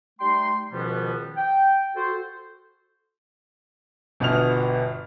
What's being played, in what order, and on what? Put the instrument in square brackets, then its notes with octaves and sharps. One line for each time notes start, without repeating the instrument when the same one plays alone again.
[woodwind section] G3 A3 D#4 G5 C6
C#2 B2 D#3 F3 G3 B3
G5
F#4 A4 C5
[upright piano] G1 B2 B3 F6 F7